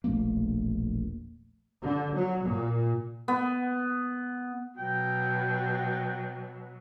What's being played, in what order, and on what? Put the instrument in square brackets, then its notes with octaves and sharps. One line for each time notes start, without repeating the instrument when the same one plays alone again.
[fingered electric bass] E1 A#1 A3 A#3
[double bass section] D3
F#3
A#2
[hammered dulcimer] B3
[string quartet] B2 F#3 [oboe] G5